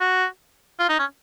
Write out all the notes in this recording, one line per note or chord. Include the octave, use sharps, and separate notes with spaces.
F#4
F4
D#4
C#4